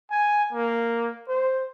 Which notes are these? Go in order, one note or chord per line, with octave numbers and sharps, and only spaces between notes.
G#5
A#3
C5